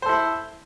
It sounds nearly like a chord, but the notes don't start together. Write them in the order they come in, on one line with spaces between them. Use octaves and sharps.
C5 A4 E4